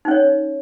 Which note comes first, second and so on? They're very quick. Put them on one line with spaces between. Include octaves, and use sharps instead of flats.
D#4 C#4 C#5